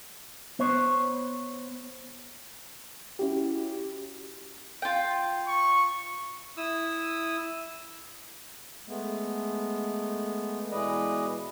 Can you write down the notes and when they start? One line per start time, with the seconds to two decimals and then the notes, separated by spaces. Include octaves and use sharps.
0.59 B3 C5 C#5
3.19 C#4 E4 F#4 G4
4.82 F4 G5
5.48 C#6
6.57 E4 D#6 E6
8.88 G#3 A3 B3
10.71 B2 E3 G#3 B4 D5 D#5